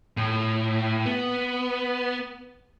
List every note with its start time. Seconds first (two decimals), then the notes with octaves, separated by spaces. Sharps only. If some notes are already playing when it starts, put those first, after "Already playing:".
0.17 A2
1.06 B3